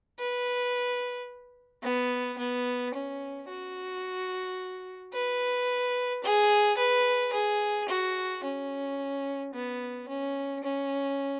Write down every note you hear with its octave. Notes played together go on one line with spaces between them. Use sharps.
B4
B3
B3
C#4
F#4
B4
G#4
B4
G#4
F#4
C#4
B3
C#4
C#4